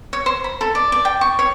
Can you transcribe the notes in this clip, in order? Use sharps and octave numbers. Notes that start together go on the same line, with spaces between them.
C#5
C5
B5
A4
D5
D5
G5
C#6
C#5